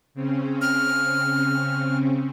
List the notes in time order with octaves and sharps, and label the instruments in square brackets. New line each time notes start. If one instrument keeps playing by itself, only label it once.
[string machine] C#3 C4 C#4
[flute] F6